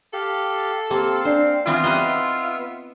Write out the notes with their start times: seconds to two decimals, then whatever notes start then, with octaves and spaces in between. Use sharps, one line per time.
0.13 G4 A4 F5
0.90 A#3 C4 G4 F5
1.25 D4 C5 D5 C7
1.67 E3 B3 C4 F4 D#6 F6
1.84 G3 D#4 E4 B4 D#5 B5 G7
1.98 B3 E5